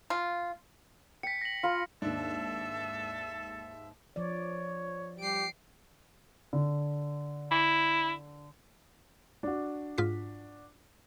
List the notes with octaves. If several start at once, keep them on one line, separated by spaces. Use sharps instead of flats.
F4
G5 B6 C#7
A#6 F#7
F4 F5 B5
D#2 G#2 D4 A4 E5
F3 C#5 D5
G3 G4 C7 D7
D3
E4
D4 F#4
G#2 F4 B6